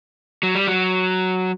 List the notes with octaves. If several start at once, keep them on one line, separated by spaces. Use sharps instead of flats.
F#3
G3
F#3